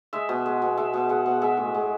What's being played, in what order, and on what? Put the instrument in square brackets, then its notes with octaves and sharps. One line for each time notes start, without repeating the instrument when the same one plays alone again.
[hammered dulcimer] G#3 E5
B2
G#3
B2
G#3 E5
B2
G#3 F#5
B2
G#3 E5
A2
G#3